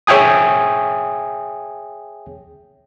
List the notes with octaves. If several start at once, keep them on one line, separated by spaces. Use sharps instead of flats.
G#4 C#5 E5 G5 G#5 D#6